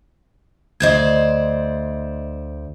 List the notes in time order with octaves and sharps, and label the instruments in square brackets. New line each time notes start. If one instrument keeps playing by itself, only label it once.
[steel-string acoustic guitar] D2 C5 D5 [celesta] D#5 G#6